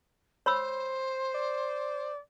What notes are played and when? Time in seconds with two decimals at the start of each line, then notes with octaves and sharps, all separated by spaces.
0.46 C5 C#5 B5 E6
1.34 D5